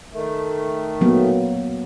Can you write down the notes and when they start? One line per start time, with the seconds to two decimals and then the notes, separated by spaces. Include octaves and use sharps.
0.13 D#3 A3
1.01 F#3 A#3 B3